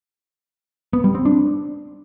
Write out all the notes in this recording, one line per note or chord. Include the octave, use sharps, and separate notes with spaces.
B3
G3
C4
D4